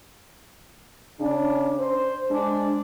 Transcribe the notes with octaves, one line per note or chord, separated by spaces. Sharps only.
C#3 C#4 D4
C5
G#3 D4